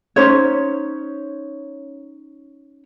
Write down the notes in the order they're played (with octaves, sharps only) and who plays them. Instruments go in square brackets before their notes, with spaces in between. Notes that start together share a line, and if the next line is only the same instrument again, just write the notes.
[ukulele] C#4 D#4 C5 C#5